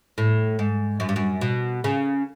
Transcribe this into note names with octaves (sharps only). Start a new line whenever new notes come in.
A2
G#2
F#2
G2
F#2
B2
C#3